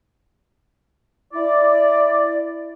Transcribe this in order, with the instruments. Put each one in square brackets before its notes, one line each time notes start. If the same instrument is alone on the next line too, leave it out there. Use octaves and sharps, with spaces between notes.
[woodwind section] E4 D5